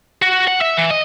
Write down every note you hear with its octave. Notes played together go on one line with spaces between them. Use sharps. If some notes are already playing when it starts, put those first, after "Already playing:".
F#4
F#5
E5
E3
D#5